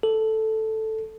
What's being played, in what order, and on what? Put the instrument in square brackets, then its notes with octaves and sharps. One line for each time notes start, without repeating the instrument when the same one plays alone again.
[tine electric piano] A4